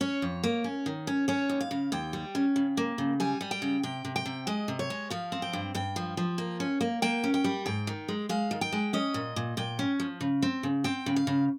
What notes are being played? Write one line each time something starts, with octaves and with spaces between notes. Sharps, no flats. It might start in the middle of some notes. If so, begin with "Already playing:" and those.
C#4 C#5
F2
A#3
C#4
D#3
C#4
C#4 C#5
D#2
F5
C#3
D#2 G5
G3
C#4
C#3
A#3
C#3
G3 G#5
G3
G5
C#3
C3 G5
C3
G5
C3
G#3 D#5
C3
C#5
G#3
F3 F5
C4
G5
G2
G2 G5
F3
F3
A#3
C#4
A#3
A#3 G5
C#4
G5
G3
G#2 G5
D#3
G#3
G#3 F5
D#3
G5
G#3
C#4 D#5
A#2
A#2
A#2 G5
C#4
F3
C#3
C4
C#3
C4 G5
C#3
F5
C#3